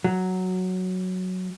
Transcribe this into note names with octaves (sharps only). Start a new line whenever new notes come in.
F#3